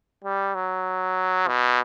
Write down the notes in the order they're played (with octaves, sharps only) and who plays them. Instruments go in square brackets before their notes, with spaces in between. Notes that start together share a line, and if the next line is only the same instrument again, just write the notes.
[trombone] G3
F#3
B2